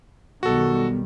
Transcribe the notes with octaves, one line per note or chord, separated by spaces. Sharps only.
B1 D#3 G3 B3 F#4 A4